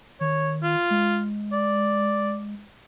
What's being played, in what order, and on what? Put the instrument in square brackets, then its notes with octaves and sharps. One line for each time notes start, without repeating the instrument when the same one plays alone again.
[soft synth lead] D#3 [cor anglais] C#5
[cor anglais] F4
[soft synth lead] G#3
[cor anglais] D5